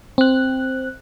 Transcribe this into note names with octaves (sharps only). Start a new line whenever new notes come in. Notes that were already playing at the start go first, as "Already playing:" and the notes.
C4 F#6